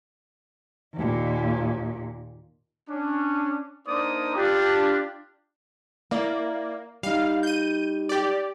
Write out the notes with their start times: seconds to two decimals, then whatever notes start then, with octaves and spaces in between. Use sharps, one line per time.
0.94 D#2 A#2
2.89 C#4 D4
3.88 A#3 D4 D#4 C5 D5 D#6
4.36 D4 F4 G4
6.11 A#3 E4 D5
7.03 G3 D#4 F5
7.43 G6 D#7
8.09 G4 D5